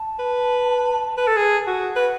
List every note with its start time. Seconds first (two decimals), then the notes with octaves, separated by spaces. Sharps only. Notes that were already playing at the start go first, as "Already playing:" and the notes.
Already playing: A5
0.19 B4
1.17 B4
1.27 A4
1.37 G#4
1.67 F#4
1.96 B4 F#5